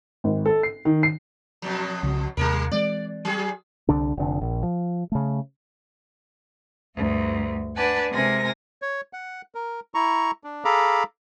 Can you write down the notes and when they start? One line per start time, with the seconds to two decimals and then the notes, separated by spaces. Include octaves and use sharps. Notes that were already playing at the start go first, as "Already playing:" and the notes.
0.24 G#1
0.46 A4
0.63 C7
0.85 D#3
1.03 C7
1.62 F2 B2 F#3
2.03 C2 C#3
2.37 D#2 C3 G3 A#3 A#4
2.72 E3 G#3 C4 D5
3.25 F#3 G#4
3.89 C2 D3 D4
4.17 F1 D3
4.41 A#1
4.63 F3
5.12 C#3 A3
6.96 D2 G2
7.76 D4 B4 D5 F#5 G#5 A5
8.11 C3 G#3 A#4 G#5 A#6
8.82 C#5
9.13 F#5
9.55 A#4
9.94 E4 A#5 C#6
10.44 D4
10.65 G#4 A4 F5 A#5 B5 D6